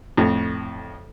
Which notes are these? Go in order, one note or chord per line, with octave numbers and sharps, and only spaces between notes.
F2 A2